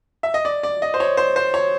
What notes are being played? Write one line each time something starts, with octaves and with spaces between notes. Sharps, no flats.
E5
D#5
D5
D5
D#5
C5
C#5
C5
C5
C#5